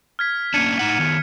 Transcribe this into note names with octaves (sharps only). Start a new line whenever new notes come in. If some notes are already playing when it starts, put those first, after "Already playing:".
F6 G#6 B6
A#3 C#4 D4 G#6 C#7 D#7
A2 D#4 F#5
D#3 B3